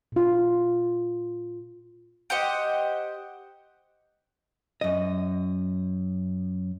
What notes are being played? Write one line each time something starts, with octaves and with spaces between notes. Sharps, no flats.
A#2 F4
G4 C5 D#5 F#5
F#2 D#5